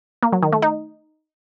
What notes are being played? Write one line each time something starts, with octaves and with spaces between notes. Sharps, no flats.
A#3
F#3
D#3
A3
D#4